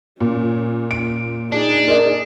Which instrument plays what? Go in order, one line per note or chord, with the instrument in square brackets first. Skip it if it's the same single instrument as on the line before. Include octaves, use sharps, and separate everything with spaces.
[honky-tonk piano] A#2 [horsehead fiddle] C#4
[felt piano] D7
[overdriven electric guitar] D4 [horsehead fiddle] D#4 G#4
[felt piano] A#4 D5 D#5